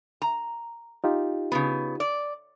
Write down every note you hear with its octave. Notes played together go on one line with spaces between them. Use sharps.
A#5
D#4 F4 G4
C#3 B3
D5